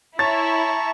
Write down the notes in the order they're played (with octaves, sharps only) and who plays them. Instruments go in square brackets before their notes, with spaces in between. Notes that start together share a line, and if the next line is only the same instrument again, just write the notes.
[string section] E4 [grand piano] C#5 A6 [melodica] A5 A#5 C#6